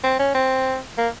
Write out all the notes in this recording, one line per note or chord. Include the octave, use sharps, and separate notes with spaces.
C4
C#4
C4
A#3